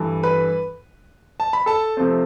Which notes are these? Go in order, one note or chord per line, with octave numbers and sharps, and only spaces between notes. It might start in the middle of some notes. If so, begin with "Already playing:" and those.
Already playing: G2 E3 A3
B4 B5
A5
B5
A4 A5
C3 F3 A3 C4